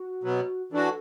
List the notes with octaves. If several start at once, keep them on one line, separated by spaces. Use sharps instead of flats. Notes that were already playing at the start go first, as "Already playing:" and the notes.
Already playing: F#4
B2 F#3 B3
E3 D4 F#4 A4